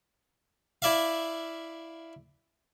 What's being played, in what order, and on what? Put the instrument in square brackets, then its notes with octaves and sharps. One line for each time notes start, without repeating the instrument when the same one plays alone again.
[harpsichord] E4 D5 E5 F5